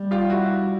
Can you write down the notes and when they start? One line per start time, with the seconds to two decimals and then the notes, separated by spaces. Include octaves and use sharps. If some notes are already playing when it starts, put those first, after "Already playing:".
Already playing: G3
0.11 F4 G4
0.30 E4 F#4